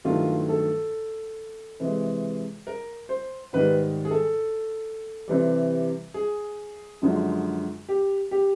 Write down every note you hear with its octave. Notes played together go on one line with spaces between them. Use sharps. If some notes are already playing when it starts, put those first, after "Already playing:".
G2 D#3 F#3 A3 F4
A4
C3 E3 G#3
A#4
C5
G#2 D#3 G3 B4
G#4
A4
C3 E3 G3
G#4
F#2 D3 F3 G#3
G4
G4